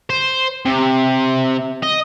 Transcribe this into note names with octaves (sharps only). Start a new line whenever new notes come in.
C5
C3
D#5